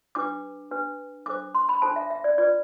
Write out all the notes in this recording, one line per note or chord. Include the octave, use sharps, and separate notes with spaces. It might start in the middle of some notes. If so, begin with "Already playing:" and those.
D4 G4 B4 D6
D4 G4 B4
D4 A4 C5 D6
C6
B5
D4 A4 C5 A5
E5
E5
D5
F4 B4 D5